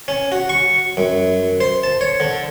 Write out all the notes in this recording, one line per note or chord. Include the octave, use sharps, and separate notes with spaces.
C#4
F#4
C#6
F#2
C5
A5
C#5
D3